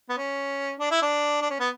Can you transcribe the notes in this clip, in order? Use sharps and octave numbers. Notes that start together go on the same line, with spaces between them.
B3
C#4
D4
E4
D4
D4
C#4
B3